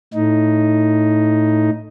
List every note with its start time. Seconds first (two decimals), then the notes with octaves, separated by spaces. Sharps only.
0.14 A2 D#4